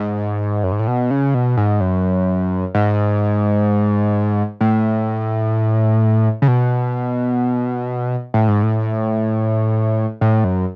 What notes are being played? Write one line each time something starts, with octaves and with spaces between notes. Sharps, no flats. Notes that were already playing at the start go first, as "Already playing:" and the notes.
Already playing: G#2
F#2
G#2
A2
B2
C#3
B2
G#2
F#2
G#2
A2
C#3
B2
A2
G#2
A2
A2
F#2